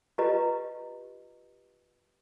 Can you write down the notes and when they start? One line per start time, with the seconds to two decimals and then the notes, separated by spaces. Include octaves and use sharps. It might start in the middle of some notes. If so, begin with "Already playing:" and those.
0.18 F4 G4 B4 D#5 A#5